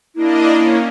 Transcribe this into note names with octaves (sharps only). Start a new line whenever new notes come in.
A#3 D4 E4 D#5
A#3 C#4